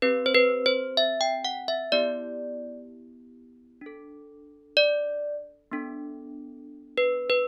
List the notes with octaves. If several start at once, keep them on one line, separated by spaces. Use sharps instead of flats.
C4 G4 B4
C5
B4
C5
E5
G5
F#5
E5
B3 E4 G4 D5
D4 A4
D5
B3 D4 A4
B4
B4